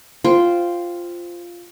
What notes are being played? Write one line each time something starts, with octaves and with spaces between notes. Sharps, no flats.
F4 C5 G5